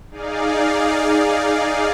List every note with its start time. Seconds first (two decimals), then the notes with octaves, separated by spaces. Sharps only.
0.11 D#4 G#4 D5 F5